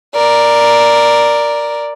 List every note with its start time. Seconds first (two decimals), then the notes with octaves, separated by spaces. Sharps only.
0.15 A#4 D5